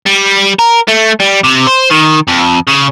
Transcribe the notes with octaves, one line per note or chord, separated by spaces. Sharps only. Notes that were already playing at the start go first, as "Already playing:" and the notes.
G3
A#4
A3
G3
C3
C5
D#3
F2
C#3